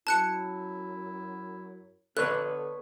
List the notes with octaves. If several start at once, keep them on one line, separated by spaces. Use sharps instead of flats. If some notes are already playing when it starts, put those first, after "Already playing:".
F#2 F#3 E4 A5 F#6 C#7
D3 B3 A4 B4 C#5 F#6